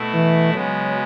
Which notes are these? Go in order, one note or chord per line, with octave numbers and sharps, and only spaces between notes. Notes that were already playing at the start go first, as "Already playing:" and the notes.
Already playing: B2 A3 E4
E3
C#3 F#3 G#3 B3